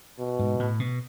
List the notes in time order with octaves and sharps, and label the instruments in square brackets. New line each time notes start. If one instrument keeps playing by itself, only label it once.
[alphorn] B2
[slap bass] G#2
A2
B2